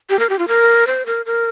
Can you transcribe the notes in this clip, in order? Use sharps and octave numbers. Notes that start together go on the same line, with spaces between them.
G4
A#4
G4
F4
A#4
C5
A#4
A#4